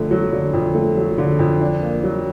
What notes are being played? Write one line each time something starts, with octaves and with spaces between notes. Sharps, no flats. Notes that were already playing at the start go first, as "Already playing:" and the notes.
Already playing: F2 D3 A3
F#3
D3
F2
A3
F#3
D3
F2
D4
A#3
F#3